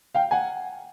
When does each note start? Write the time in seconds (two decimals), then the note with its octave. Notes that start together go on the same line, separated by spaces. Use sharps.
0.15 F5 G5
0.31 F#5 G#5